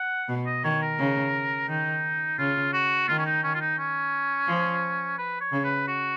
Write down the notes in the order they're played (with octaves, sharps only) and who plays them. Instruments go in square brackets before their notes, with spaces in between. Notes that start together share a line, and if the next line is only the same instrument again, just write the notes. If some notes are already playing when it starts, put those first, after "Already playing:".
Already playing: [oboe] F#5
[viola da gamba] B2
[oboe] D#5
[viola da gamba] D#3 [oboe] C#5
[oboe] A#4
[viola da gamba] C#3
[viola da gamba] D#3 [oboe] D#4
[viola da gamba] C#3 [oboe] F4
[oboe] F#4
[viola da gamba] D#3 [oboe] F4
[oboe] C#4
D#4
C#4
F4
D#4
C#4
[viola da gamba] F3
[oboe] B4
C#5
[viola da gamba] C#3
[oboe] B4
F#4